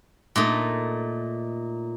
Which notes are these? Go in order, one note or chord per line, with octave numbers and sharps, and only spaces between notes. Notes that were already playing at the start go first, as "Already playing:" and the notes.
A#2 A3 D#4